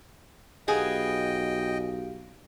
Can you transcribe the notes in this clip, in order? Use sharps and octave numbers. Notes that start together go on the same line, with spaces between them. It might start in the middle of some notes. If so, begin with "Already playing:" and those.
B1 B3 G4 G#4 D#5 F5 G5